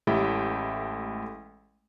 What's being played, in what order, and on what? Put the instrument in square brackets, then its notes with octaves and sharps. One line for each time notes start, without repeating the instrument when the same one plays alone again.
[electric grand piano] A1 G#3 A3 E4 G4 G5